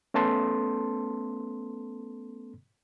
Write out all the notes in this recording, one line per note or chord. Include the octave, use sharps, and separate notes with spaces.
A3 B3 C#4 A4 A5 C6